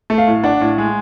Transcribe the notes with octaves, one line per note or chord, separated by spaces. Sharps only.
A3
F5
A2
D4 F#5
A2
G#3